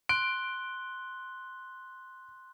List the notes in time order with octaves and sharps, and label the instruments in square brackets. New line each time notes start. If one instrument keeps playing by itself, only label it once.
[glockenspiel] C6 F#6 G7 [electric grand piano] D7